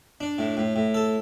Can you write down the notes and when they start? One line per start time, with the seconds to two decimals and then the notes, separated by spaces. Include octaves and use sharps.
0.20 D4
0.38 A2
0.57 A2
0.76 A2
0.94 A4